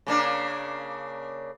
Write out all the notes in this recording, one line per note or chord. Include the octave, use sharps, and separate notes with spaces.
C#3 A#3 D4